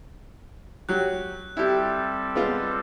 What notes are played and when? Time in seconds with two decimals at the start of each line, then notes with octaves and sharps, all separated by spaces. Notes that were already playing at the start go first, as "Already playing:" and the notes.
0.89 F#3 G4 F#6
1.57 G3 C4 E4 G4 A4
2.36 G#3 B3 F4